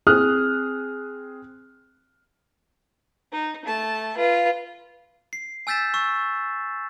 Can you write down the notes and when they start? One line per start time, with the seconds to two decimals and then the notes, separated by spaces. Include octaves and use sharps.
0.07 C4 G#4 D#6 F6 F#6
3.32 D#4
3.65 A3 A5
4.17 F4 B4
5.33 C7
5.67 G#5 E6 G6 A6 B6 E7
5.94 C#6 E6